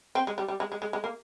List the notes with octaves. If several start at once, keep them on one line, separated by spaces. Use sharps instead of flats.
C4
G#3
G3
G3
G#3
G#3
G#3
G#3
A#3